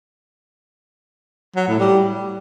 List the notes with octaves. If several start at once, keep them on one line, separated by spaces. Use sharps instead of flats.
F#3
A2
G3